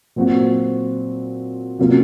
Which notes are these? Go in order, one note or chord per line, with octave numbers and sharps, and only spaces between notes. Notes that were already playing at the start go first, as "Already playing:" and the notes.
A#2 F#3 C4 F#4
C3 F#3 A#3 C#4 F4